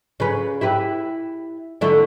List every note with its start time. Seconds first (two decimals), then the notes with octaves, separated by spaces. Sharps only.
0.20 C#3 B4
0.61 E4 G4 B4
1.81 D3 A3 E4